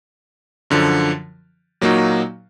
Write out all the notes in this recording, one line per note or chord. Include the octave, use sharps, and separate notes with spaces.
F#2 D3 F3
A#2 F#3 A#3 D#4 F#4